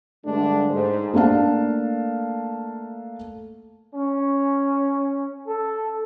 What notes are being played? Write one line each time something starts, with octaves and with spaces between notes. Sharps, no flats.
G2 D3 G#3 A3 D4
G#2 C5
A3 A#3 D4 F5 A5
C#4
A4